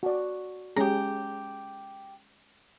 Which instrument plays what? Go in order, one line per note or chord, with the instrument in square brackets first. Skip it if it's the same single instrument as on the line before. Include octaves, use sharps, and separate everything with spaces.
[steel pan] F#4 D5
[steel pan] G#3 C#4 G#4 [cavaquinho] G4 A#5